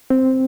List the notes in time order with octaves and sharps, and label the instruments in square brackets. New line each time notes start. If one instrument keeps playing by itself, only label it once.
[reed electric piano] C4